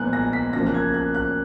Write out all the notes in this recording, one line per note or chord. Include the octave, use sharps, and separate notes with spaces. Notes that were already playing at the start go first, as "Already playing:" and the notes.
Already playing: A#2 F3 G#3 B3 G#5 A#5 F#6
A#6
B6
C#3 F3 A#3 A#6
F#6
G#6
F#6
F#6